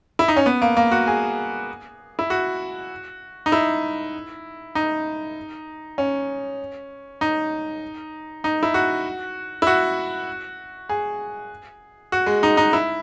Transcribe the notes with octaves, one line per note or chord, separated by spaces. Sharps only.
E4
D#4
C#4
B3
A#3
A#3
F#4
G#4
E4
F#4
D#4
E4
D#4
C#4
D#4
D#4
E4
F#4
E4
F#4
G#4
F#4
G#3
D#4
D#4
E4